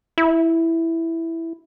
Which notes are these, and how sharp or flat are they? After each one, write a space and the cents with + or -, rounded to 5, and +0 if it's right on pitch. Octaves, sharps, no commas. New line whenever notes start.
E4 +0